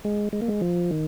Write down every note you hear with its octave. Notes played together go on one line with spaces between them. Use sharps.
G#3
G#3
A#3
G#3
F3
D#3